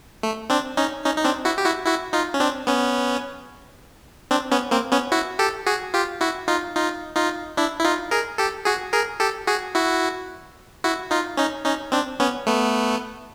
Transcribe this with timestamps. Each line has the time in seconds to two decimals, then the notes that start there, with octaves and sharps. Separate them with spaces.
0.23 A3
0.50 C4 D4
0.77 C#4 D#4
1.04 C#4 D#4
1.18 D#4
1.25 C4 D4
1.45 E4 F#4
1.58 G4
1.65 E4 F#4
1.86 E4 F#4
2.13 D#4 F4
2.34 C#4
2.40 C4 D4
2.67 B3 C#4
4.31 C4 D4
4.52 B3 C#4
4.71 A#3 C4
4.92 B3 C#4
5.12 E4 F#4
5.39 G4 A4
5.66 F#4 G#4
5.94 F4 G4
6.21 E4 F#4
6.48 D#4 F4
6.75 D#4 F4
7.16 D#4 F4
7.57 D4 E4
7.79 E4
7.84 D#4 F4
8.11 G#4 A#4
8.38 G4 A4
8.65 F#4 G#4
8.93 G#4 A#4
9.20 G4 A4
9.47 F#4 G#4
9.75 E4 F#4
10.84 E4 F#4
11.11 D#4 F4
11.37 C#4 D#4
11.65 C#4 D#4
11.92 C4 D4
12.20 B3 C#4
12.46 A3 B3